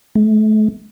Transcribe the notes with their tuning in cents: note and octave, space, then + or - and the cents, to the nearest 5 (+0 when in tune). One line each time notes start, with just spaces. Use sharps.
A3 -35